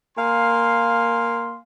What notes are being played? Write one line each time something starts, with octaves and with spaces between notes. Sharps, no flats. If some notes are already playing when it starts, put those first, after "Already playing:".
A#3 F5 G#5 C6